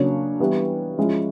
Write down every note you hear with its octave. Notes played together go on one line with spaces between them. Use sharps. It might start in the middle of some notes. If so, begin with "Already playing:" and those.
Already playing: C#3 F#3 A#3 D4 C#5
E3 G3 B3
F3 G#3 C#4 E4